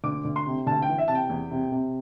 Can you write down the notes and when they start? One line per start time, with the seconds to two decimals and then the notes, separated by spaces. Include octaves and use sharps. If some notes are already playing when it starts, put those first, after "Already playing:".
0.04 D2 D6
0.25 D2
0.36 C6
0.47 C3
0.67 D2 A5
0.82 G5
0.89 E3
0.98 E5
1.08 C3 A5
1.15 G5
1.30 E2
1.51 C3
1.72 C3